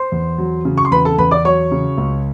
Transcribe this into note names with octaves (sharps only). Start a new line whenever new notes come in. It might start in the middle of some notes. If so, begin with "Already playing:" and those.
Already playing: C5 C6
E2
F#3
C#3
C#6
C6
E2 B4 B5
A4 A5
E2 B4 B5
D5 D6
F#3 C#5 C#6
C#3
C#2